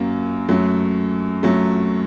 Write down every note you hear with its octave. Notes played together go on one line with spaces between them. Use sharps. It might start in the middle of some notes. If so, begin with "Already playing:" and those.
Already playing: F#2 F#3 A#3
F#2 F#3 A3
F#2 F#3 A3